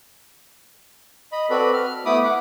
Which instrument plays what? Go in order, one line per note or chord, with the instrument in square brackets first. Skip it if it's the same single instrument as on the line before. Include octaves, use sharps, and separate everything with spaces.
[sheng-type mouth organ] D#5 B5
C4 F#4 A4 B4 D5 B5
F6
A3 B3 E4 B5 D6 D#6
F#5 D6